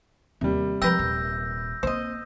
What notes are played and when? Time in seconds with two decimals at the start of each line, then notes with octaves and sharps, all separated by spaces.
0.41 D#2 C3 G3
0.82 F3 G#3 A#4 B4 G5 E6 G6 A#6
0.99 D#1
1.83 A#3 C4 C5 D#5